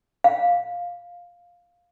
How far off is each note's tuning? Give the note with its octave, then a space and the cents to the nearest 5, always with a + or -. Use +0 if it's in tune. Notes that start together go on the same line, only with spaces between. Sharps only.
F5 +5